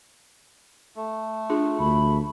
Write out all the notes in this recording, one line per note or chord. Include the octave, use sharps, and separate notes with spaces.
A3
D4 F4 G#4
D2 B5